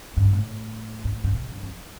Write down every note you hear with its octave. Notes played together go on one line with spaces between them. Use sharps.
G2
A2
A2
G2
B2
G2
F2